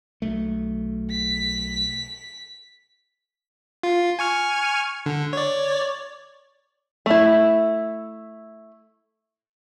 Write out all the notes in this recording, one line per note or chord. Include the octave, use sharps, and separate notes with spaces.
B1 A3
B6
F4
G#5 C#6 F6
D3
C#5 D5
A3 E4